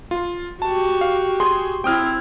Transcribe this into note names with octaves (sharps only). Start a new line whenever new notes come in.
F4
F#4 G4 A5
F5
G#4 C6
C4 E4 G5 D#6 F6